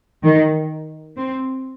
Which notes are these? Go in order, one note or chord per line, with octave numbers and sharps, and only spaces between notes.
D#3
C4